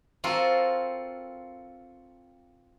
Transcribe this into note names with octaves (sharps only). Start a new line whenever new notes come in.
C4 F4 F#4 A4 A#4